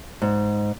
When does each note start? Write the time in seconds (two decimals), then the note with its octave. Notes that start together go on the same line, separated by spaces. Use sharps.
0.22 G#2